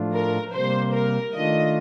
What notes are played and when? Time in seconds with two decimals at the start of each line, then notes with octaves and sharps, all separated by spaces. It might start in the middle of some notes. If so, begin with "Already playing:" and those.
Already playing: A2 F3 A3 D4 F4
0.14 A#4
0.54 C3 G3 A#3 C5
0.94 A#4
1.35 D#3 A3 D4 F4 D#5